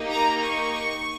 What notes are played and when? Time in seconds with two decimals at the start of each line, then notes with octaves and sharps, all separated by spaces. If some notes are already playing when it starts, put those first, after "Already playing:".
Already playing: A#3 D#4 G4
0.10 A#5
0.43 C#6